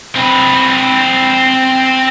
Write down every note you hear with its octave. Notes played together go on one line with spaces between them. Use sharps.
C4 B4